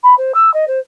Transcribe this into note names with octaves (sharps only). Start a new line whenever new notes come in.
B5
C5
E6
D#5
C5